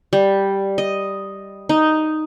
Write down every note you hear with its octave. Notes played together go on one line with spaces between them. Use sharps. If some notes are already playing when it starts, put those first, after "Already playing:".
G3
D#5
D#4